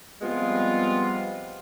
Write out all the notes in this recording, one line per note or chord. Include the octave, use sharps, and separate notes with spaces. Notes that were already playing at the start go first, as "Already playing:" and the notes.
F3 G3 G#3 B3 C4 F4